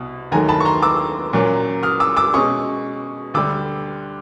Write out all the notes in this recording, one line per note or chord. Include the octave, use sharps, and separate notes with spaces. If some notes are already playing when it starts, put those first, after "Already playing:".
Already playing: C2 B2
D#2 D#3 F#3 A3 G#5 A#5
A5 B5
C#6
A#5 C6
D6 E6
A#2 F#3 A#3 C#4
D#6 F6
D6 E6
D6 E6
B2 G#3 C#4 C#6 D#6
D2 D3 G3 D6 E6